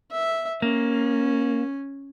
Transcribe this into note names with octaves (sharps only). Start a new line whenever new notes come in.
E5
A#3 C#4